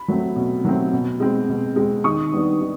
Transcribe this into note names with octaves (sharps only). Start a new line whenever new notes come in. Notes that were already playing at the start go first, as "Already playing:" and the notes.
Already playing: B5
F#3 A3 C4
B2
F#3 A3 C4
B2
G#3 C4
B2
G#3 C4
D#3 C#6 D#6
G3 B3 D4
D#3